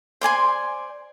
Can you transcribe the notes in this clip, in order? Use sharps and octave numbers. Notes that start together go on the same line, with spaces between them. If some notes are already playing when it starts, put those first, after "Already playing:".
C5 D5 G#5 C6